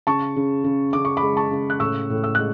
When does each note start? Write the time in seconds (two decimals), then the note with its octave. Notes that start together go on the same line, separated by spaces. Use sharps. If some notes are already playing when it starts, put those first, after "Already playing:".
0.07 C#3 A5 C#6
0.36 C#3
0.64 C#3
0.93 C#3 D6
1.05 C#6
1.17 B5 D6
1.23 G#3
1.37 A5 C#6
1.51 C#3
1.70 F#6
1.80 A2 C#6 E6
2.10 A2
2.24 E6
2.35 G#3 F#6